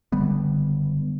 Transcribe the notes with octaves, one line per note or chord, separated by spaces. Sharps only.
F#1 D3 G3 B3